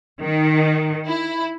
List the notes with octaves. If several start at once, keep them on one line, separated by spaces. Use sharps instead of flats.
D#3
E4